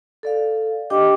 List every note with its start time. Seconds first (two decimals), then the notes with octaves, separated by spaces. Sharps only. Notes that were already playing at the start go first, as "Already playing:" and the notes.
0.23 A4 D5 F5
0.90 D4 G4 D#5 G5 D6